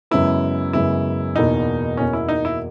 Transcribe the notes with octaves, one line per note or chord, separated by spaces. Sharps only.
F#2 C#3 G#3 B3 E4
F#2 C#3 G#3 B3 E4
E2 B2 A#3 D#4
E2 B2 A#3 C#4
E4
D#4
E4